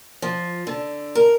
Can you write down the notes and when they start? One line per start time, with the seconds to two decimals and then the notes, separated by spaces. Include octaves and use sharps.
0.22 F3
0.67 D3
1.15 A#4